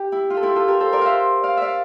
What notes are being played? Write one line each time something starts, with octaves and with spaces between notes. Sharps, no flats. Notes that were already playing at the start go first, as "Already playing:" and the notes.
Already playing: G4
E4
F4
A4
E4 G4
F4 A4
G4 A#4
A4 C5
A#4 D5
C5 E5 F5
D5 F5
D5 E5 F5